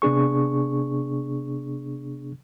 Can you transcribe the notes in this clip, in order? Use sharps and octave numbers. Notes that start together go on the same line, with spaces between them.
C3 B3 D4 G#4 C#6